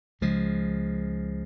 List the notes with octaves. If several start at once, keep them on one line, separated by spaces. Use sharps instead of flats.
C#2 C#3 F3 G#3